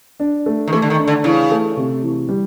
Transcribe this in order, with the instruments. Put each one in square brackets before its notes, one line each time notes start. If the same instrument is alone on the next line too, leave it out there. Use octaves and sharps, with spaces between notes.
[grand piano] D4
A3
[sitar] D#3
[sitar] E3 [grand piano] A3
[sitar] D3
D#3
[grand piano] D4
[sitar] D3
[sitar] C#3 [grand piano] E3
[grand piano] A3
C3
E3
G3